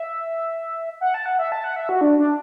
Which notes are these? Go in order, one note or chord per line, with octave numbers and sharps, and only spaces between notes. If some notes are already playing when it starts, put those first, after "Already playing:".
Already playing: E5
F#5
A5
F#5
E5
A5
F#5
E5
F#4
D4
D4